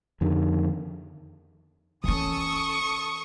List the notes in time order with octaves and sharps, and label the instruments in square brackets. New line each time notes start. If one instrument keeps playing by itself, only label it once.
[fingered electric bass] F2 D3 D#3
[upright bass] E3 C#4 [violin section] A4 C#6 D#6